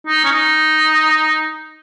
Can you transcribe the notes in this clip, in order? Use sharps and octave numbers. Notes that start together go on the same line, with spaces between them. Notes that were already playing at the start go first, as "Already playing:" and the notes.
D#4
C#4
D#4